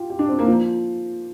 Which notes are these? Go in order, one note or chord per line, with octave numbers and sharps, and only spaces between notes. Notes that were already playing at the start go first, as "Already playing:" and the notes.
Already playing: F4 G4
G4
D4
C4
A#3
F3